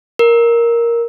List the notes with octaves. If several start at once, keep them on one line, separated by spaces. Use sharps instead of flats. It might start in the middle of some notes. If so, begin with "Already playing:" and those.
A#4